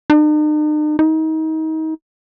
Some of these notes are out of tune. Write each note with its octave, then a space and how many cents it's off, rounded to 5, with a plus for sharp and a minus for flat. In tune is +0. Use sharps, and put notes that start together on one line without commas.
D#4 -45
D#4 +30